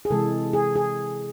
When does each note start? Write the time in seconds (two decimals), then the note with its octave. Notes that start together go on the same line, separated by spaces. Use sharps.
0.05 G#4
0.10 C3 E3 G#3 A4
0.53 G#4
0.76 G#4